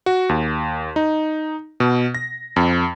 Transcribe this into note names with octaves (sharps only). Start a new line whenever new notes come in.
F#4
D#2
D#4
B2
A#6
F2